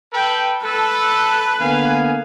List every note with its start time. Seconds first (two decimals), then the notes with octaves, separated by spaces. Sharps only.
0.13 A4 B4 G5
0.63 A4 B4
1.61 D3 A#3 B3 F5 G#5